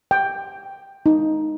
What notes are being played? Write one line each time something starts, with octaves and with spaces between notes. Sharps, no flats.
G5
D#4